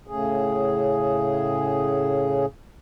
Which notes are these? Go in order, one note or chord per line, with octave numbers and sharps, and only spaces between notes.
A2 C#3 G#4